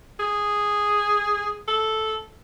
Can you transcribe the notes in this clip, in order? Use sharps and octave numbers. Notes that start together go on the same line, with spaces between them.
G#4
A4